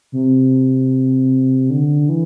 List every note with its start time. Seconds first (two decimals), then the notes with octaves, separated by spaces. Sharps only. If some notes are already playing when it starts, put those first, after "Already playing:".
0.12 C3
1.70 D3
2.09 E3